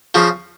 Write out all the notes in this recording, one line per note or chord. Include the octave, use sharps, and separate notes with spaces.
C#3 F3